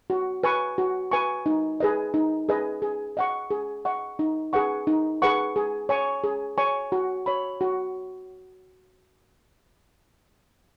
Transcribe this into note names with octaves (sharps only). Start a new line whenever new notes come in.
F#4
B4 G#5 C#6
F#4
B4 G#5 C#6
D#4
G#4 B4 D#5
D#4
G#4 B4 D#5
G#4
D#5 F#5 C#6
G#4
D#5 F#5 C#6
D#4
G#4 B4 F#5 C#6
D#4
G#4 B4 F#5 C#6
G#4
C#5 G#5 C#6
G#4
C#5 G#5 C#6
F#4
C#5 B5
F#4